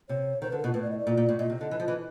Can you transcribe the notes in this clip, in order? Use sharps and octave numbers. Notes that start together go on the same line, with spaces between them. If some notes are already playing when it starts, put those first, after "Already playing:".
C3 C#5
D#3 C5
D3 B4
A#4
B2 F4
A2 B4
D5
D#5
D5
A#2
A#2
A2
A#2 D#5
C3
D3
E3
F3
E3